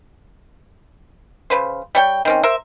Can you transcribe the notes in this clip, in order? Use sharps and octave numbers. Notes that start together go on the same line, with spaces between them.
C#3 B4 C5
G3 C#5 G5
D#3 C4 C#4
A#4 C5 E5